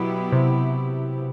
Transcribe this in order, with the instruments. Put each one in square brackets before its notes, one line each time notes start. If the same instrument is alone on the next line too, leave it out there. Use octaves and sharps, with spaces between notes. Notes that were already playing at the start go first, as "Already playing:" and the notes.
Already playing: [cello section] B2 F#3 B3 E4 G4
[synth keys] C3